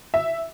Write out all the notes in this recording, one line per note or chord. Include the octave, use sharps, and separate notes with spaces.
E5